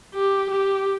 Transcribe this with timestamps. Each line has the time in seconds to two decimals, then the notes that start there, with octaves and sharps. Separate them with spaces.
0.15 G4
0.51 G4